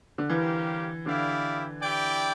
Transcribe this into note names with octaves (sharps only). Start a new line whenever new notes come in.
D3
E3 G3 C4 G4 A#4 F5
D3 E4 G4 D5 F5
E4 G4 D5 G5